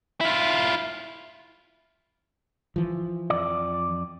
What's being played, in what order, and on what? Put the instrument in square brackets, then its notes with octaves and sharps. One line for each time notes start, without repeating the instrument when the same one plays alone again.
[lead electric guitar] E4 F4
[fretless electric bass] E3 F3
[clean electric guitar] F2 D5